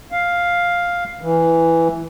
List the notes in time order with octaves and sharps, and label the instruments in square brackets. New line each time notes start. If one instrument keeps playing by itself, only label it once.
[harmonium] F5
E3